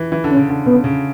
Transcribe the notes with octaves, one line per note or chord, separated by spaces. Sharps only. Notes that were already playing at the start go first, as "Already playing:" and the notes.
Already playing: E3
E3
D3
C#4
C#3
D3
C#3 B3
C#3